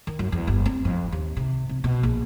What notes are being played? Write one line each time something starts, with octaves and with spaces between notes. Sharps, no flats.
D#3
F#2
E2
G1
C4
F2
D#2
C3
C3
B2
A#1